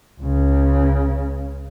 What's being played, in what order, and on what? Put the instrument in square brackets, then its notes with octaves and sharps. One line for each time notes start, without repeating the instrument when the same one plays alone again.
[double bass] C#2 C#3